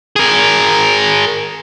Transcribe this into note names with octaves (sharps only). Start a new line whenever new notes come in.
G#4 A#4